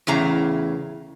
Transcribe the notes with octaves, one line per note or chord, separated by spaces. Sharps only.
E2 A2 C#3 A#5